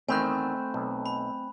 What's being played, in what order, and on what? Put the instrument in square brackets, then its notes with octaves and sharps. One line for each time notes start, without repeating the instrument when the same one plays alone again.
[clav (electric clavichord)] E2 D#3 [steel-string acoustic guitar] A3 [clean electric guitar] C4 [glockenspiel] G#5 B5 F#6
[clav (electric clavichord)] B1
[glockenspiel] B5